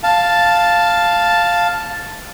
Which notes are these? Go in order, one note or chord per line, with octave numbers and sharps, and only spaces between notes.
F5 A5